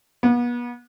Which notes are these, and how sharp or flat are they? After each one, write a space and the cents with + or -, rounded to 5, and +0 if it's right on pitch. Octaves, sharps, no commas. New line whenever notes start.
B3 -35